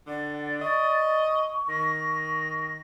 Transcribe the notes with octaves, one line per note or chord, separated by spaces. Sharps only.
D3 D5 F#5
D#5 C#6
D#3 A#6